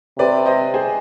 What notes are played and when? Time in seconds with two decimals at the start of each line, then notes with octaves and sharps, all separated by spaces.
0.18 C3 B4 D5
0.46 C5 D#5
0.74 G#4 C5